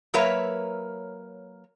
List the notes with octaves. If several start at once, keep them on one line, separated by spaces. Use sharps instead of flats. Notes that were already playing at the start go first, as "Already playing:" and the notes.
F#3 A#3 A#4 B4 C#5 E5